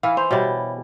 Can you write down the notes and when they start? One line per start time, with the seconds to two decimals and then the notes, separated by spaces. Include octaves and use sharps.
0.03 E3 E4 F5
0.17 C5 F7
0.31 B2 G3 C#5 E5 B5